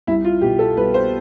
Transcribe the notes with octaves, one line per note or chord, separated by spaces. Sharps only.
C2 E4
F4
B2 G4
A4
C2 B4
C5